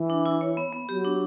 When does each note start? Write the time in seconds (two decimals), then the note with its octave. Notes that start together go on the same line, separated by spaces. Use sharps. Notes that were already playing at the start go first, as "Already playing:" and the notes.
Already playing: E3
0.10 D4
0.26 E4
0.41 C#5
0.57 B3
0.73 B3
0.88 F#3 G4
1.04 D4